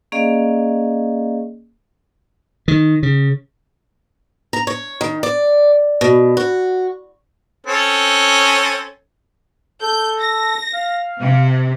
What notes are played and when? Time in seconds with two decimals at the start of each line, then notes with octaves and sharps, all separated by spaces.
0.12 A#3 C#4 G#4 D5 D#5 F5
2.68 D#3
3.03 C#3
4.53 A#5
4.67 C#5
5.01 D#3
5.23 D5
6.01 B2
6.37 F#4
7.67 C4 C#4 A4
9.82 A4 G6
10.20 A#6
10.74 F5
11.20 C3